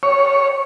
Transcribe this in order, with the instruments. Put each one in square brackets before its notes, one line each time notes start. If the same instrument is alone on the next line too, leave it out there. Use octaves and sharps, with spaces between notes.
[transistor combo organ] C#5